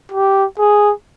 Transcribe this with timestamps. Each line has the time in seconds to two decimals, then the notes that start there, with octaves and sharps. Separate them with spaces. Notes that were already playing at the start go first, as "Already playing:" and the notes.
0.12 G4
0.59 G#4